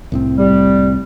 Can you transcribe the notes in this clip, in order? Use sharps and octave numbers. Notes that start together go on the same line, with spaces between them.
C2 A2 C4
G3